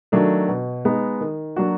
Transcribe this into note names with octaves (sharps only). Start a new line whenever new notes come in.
D#3 F#3 A3 D4
B2
G#3 B3 D#4
D#3
F#3 A#3 D4 F#4